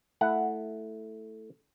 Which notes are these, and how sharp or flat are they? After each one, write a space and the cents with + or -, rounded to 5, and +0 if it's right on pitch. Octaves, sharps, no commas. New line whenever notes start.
A3 +0 E4 +0 F#5 +0